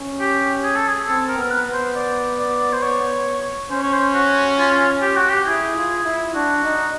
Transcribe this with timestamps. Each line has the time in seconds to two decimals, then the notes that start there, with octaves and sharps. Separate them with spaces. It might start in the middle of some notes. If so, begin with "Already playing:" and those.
Already playing: C#4
0.20 G4
0.64 G#4
0.76 A4
0.89 G#4
1.07 C4 A4
1.29 A#4
1.37 B3
1.43 A#4
1.51 B4
1.66 B3
1.73 C5
1.95 D5
2.40 D5
2.73 C5
2.83 C#5
3.71 C#4 C5
3.83 C#5
3.94 C5
4.14 F#4
4.59 F4
5.02 G4
5.16 F#4
5.29 G4
5.46 E4 G#4
5.76 F4
6.05 E4
6.34 D4 F#4
6.64 D#4